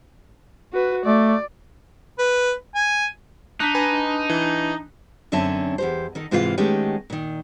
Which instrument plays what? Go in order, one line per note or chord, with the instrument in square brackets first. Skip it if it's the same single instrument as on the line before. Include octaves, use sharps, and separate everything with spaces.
[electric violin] F#4 B4
[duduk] A3 [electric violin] D5
[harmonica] B4
G#5
[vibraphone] D4 A5 [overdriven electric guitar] D#4 [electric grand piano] F#6 B6
[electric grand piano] B4 G#5
E3
[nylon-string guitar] F#2 D3 C4 C#4 E5 A5
E2 G4 C5
D#3 D#4 A4
G#2 C3 E3 F4 F#4 F5
D#3 G#3 A3 B3 C#4 G4
A#2 D#3